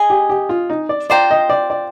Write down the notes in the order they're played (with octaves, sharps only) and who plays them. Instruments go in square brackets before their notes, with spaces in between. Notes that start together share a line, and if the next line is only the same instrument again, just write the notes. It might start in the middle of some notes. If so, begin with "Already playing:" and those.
Already playing: [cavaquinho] G#4 D#5 G#5
[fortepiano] G4
G4
F4
D#4
D5
[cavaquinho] F4 C5 G5 A#5 [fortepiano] D5
[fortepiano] D#5
D5
D5